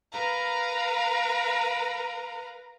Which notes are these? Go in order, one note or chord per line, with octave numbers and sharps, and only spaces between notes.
A#4 B4 F5 A#5